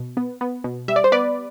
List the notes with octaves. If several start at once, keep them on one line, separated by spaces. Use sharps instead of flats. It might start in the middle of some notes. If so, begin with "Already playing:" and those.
Already playing: B2
B3
B3
B2
G3 E5
D5
C5
B3 B4 D5